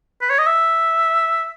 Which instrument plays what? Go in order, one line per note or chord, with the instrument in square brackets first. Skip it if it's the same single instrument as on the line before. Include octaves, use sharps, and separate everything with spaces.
[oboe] B4
C#5
D#5
E5